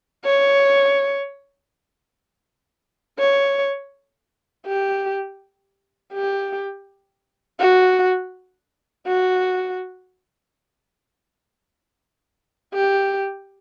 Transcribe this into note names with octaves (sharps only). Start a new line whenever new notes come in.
C#5
C#5
G4
G4
F#4
F#4
G4